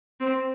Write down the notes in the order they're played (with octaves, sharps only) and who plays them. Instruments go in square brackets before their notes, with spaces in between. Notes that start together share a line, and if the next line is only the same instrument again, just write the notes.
[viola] C4